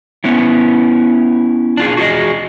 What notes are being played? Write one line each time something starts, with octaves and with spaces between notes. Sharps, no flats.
B3 C#4 E4
D4 F4 G#4
F#4 G#4 D#5